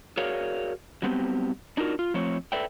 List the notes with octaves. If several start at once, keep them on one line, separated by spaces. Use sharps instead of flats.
F#4 G#4 A#4 C#5 D5 F5
F#3 G3 B3 C4 F4 G4
D4 D#4 F4 F#4 A#4
F4
F3 A3 C4 C#5
A4 B4 D5 E5 G5